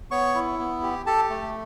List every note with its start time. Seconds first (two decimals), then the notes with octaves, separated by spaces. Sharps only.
0.11 B3 C#5 C#6
0.35 E4
0.59 B3
0.83 G4
1.06 G4 A4 A5
1.30 A3